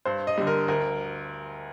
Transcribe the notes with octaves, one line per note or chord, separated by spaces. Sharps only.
G2 C5
D#5
D3 G3
A#4
D2 A#4